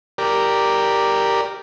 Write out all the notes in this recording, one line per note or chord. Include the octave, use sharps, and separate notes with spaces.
G4 A#4 D5